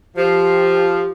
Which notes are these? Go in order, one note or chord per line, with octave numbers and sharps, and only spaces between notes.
F3 G4